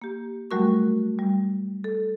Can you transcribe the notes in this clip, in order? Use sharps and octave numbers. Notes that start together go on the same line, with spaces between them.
A#3 G4
F#3 G3 A3 F#4 A#4 C#6
G3
A4